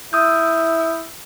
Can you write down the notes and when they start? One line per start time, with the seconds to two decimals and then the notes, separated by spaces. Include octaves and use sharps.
0.13 E4 D#6 E6 G6